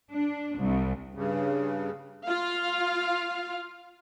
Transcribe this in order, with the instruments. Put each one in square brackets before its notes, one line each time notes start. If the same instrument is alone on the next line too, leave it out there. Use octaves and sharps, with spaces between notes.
[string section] D4
C2
[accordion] G2 C#3
[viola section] F4 F5